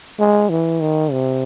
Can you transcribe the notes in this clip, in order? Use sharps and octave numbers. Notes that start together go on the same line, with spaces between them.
G#3
E3
D#3
C3